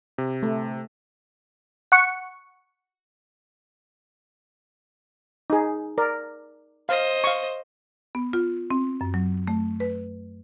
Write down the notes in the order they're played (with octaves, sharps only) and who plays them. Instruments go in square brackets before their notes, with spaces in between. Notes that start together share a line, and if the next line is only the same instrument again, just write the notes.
[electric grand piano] C3
[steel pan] A3
[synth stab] F#5 C#6
[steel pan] D#4 G#4
A#4 D5
[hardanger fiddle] C5 D#5 [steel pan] F5
[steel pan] F5 C#6
[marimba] B3
F4
C4
F#2
F#3
A3
B4